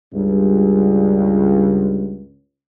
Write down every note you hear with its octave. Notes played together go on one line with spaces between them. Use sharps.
C#2 G2